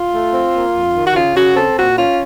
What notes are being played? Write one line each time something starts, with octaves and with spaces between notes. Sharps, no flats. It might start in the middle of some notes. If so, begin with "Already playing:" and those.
Already playing: F4
A3
C4
A#3
F2
D#3
F#4
C#3 F4
C#3 F#4
C4 A4
A#2 F#4
C#4 F4